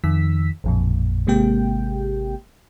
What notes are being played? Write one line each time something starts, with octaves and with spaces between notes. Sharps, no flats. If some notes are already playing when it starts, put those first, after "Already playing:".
F2 D#3 E6 B6
A1 F2 A#2
G#1 C3 G#3 A#3 G4 G5